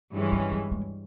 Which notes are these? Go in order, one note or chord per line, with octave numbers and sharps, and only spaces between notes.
G2 E3 G#3 C#4 E4
F#3
F#3
G#3